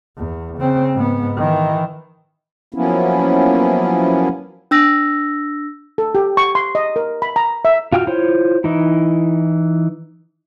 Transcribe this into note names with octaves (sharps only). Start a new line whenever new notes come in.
E2
C#3 C4
G#2 B3
D#3 E3
F3 F#3 A#3 B3 C#4 E4
D4 E6 A#6
A4
G4
C#6
C6
D#5
A#4
B5
A#5
E5
F4 F#4 G5 C6 F6
E4 F4 C5 C#5
E3 D#4 E4